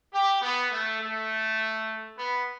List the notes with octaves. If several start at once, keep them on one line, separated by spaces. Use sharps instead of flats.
G4
B3
A3
A3
B3